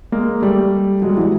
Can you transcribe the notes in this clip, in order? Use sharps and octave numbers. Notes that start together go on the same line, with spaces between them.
G#3 A#3
G3 A3
F#3 G#3
G3
E3 F#3